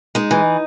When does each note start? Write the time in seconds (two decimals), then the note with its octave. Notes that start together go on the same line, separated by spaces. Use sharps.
0.15 G#3 D#4
0.31 E3